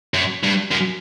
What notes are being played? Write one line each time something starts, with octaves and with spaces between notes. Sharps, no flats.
F#2
G2
F#2